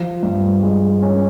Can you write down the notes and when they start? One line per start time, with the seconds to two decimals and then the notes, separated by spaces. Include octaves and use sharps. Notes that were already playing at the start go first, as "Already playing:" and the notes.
Already playing: F3
0.23 G2
0.63 G#3
1.02 C#4